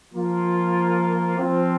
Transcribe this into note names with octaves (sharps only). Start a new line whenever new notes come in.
F3 A#3 F4
F3 C4 F4